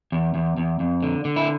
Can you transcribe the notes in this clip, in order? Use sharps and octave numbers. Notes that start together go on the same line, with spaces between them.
E2
E2
E2
F2
D3
D3
E4